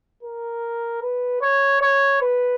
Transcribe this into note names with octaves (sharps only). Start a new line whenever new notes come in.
A#4
B4
C#5
C#5
B4